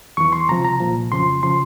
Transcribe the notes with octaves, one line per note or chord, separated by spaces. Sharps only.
E2 E3 C#6
C6
C#2 C3 F3 A#5
A#5
C2 A#2 F3
F2 C#3 F3 C6
C#3 F3 C6